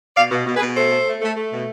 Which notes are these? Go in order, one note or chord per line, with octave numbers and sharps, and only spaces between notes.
B2 D5 F5
B2
B2
G#4 B4
B2
A3 A4 C5
A3
A3
A3
A3
B2